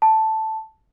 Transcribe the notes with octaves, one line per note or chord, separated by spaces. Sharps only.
A5